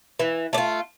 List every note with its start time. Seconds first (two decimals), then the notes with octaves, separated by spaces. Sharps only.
0.19 E3
0.53 A3 D4
0.58 F4